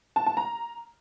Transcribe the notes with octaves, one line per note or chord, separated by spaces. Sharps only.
A5
A5
A#5